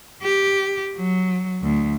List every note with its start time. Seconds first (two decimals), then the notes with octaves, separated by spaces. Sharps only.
0.23 G4
0.96 F#3
1.62 D2